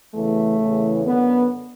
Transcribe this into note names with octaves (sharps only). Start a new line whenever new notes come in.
E2 C#3 E3 A3
E2 C#3 E3
F#2 D3 B3